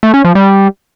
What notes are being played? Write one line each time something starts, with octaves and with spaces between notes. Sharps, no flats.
A3
C#4
F3
G3